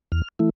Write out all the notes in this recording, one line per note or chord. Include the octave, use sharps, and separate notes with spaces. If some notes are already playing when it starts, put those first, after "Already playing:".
E2 F6
E3 A3 E4